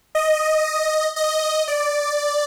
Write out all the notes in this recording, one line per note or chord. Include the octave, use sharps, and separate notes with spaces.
D#5
D#5
D5